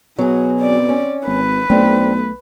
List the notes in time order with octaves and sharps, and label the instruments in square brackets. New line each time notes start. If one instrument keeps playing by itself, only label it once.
[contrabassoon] B2 [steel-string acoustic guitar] F#3 G#4 [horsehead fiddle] F#4
[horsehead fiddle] C4 D5
[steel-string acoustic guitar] C#4
[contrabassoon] G#1 [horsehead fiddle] B4
[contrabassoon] B1 [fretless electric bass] A3 [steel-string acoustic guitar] C4 D4